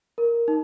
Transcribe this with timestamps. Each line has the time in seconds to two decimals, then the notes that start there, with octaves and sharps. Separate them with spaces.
0.18 A#4
0.48 D#4